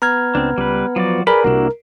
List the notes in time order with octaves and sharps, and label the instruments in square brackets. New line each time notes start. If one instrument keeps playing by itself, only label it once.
[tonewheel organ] B3 [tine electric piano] A#5 F6 G#6
[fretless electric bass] C#2 [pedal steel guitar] C4 D4
[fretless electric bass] C#2 [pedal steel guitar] G3 B4
[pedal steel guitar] F3 F#4 D5 [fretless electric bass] F#3
[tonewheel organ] G#4 B4 D5 [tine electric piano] A#4 [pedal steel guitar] B5
[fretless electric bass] C2 C3 [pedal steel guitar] A#3 D4 E4 [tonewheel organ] F#4